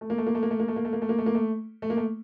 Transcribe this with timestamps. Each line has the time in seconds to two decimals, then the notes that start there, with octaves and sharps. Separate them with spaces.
0.01 A3
0.10 A#3
0.18 A3
0.27 A#3
0.35 A3
0.43 A#3
0.51 A3
0.60 A#3
0.68 A3
0.76 A#3
0.85 A3
0.93 A#3
1.02 A3
1.09 A#3
1.19 A3
1.26 A#3
1.35 A3
1.82 A3
1.90 A#3
1.97 A3